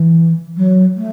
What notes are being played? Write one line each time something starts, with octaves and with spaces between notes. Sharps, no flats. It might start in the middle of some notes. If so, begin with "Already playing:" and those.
Already playing: E3
F#3
A3